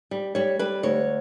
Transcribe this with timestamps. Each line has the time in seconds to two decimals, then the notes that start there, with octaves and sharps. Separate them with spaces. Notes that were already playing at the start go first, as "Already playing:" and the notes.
0.11 G3
0.35 G3 C#5
0.59 G3 B4
0.83 D2 C#5